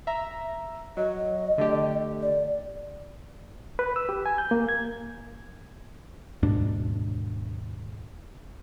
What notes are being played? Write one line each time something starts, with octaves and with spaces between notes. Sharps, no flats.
E5 A#5
F#3 D#5
D3 A3 G4
D5
B4
E6
G4
G#5
G6
A#3
G#6
D#2 G#2 B2 D4